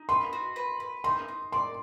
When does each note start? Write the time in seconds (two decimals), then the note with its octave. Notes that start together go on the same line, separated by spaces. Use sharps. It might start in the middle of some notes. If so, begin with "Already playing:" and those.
Already playing: D#4
0.09 B4 C6
0.33 F#4
0.56 B4
0.80 B4
1.04 D#4 C6
1.28 D#4
1.52 D5 C6